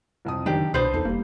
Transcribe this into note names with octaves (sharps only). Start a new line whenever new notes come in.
C2 F2 D#6
F#1 D#3 D4 D#4 G4
C2 B2 D4 B4 C5 D#6 G6 C7
E2 D#4 A4
F1 G3 A#3